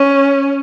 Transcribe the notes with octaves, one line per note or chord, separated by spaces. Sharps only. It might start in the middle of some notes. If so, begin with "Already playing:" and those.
Already playing: C#4